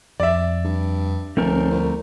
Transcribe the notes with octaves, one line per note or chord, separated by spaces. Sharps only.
F2 F3 D5 E5
G2
D#1 D2 F3 A3 C4 A#4
C2